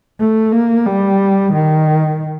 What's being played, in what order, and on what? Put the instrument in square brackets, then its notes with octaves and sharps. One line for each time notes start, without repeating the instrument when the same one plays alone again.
[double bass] A3
A#3
G3
D#3